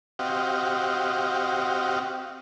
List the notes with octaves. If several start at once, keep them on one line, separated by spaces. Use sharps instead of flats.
C4 F#4 G4 D#5 F5